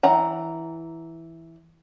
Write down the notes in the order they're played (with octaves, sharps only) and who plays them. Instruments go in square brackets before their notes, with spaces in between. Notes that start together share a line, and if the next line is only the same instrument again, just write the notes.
[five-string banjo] E3 F#5 A#5